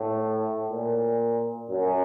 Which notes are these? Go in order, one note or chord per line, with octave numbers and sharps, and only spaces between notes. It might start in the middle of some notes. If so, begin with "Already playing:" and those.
Already playing: A2
A#2
F#2